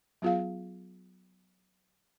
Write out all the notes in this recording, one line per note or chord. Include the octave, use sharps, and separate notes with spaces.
F#3 B3 F4 G#4 F5